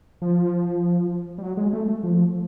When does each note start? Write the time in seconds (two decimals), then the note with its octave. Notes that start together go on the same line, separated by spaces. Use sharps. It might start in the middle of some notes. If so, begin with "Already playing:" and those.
0.22 F3
1.38 G3
1.43 F#3
1.57 G#3
1.73 A3
1.88 A3
2.03 F3